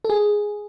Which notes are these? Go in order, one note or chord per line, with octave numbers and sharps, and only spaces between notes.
A4
G#4